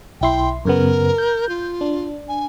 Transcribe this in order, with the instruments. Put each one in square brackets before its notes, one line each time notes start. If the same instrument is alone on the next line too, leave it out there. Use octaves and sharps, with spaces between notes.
[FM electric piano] B1 E4 C6 [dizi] G5
[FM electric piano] F#2 C#3 B3 [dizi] A#4
[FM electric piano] G6
[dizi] F4
[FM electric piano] D4
[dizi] G#5